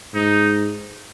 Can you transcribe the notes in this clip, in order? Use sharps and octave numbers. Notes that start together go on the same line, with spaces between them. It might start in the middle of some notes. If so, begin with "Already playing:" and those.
G#2 D#4